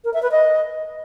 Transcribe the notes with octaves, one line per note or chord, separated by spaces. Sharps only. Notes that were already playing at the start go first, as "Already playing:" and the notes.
A#4
E5
B4
D#5